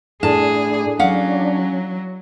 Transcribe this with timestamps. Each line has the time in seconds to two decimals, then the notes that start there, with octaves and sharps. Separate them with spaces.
0.23 A2 D4 G#4 A5
0.99 F#3 C#4 F5 F#5